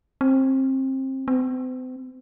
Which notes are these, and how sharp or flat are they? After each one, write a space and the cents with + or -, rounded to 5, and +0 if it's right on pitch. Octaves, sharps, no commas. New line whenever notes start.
C4 +25
C4 -40